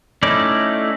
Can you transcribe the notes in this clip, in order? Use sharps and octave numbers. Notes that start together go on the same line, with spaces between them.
A3 C#4 D#4 E4 D5